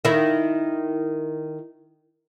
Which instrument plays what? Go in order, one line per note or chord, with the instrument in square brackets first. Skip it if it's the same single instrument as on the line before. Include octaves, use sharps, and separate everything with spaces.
[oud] D#3 E4